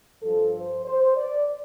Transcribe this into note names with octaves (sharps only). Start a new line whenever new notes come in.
G2 F3 A4
C5
C5
D5